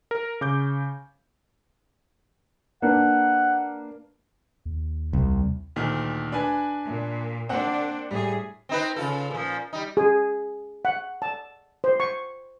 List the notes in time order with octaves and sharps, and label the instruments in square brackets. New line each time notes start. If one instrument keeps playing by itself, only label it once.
[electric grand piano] A#4
C#3 D6 G6
[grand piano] A#3 D4 B4 [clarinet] F#5
[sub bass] D#2
[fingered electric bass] C2
[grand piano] D2 A#2 D#3
D4 B4 G#5
[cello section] A#2
[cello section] A#3 D4 [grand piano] C4 F#5
[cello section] A2 G#4 [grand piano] G3
[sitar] C4 D#4 B4
C#3 F4 A4
A#2 F3
G3 D#4
[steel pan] G#4
F#5
A5
C5
C#6